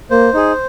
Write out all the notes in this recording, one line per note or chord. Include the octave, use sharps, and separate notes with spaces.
A#3 C5
D#4 G#4